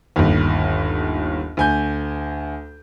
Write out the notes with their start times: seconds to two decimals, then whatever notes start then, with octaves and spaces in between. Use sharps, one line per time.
0.16 G1 D#2
1.57 D2 G#5 G6